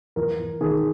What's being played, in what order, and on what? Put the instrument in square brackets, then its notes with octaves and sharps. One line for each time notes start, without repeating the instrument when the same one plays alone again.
[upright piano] E2 A#4
E2
D#3 G#4